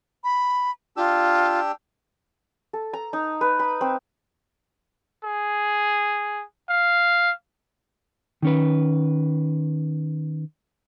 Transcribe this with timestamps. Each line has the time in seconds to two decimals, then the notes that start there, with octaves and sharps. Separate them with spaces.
0.24 B5
0.97 D4 F4 G4 E6
2.73 A4
2.93 A#5
3.13 D#4
3.41 B4
3.59 B5
3.81 C4
5.24 G#4
6.70 F5
8.42 D#3 C#4 B4